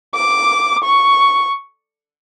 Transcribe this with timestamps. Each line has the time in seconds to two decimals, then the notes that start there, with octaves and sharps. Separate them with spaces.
0.14 D6
0.83 C#6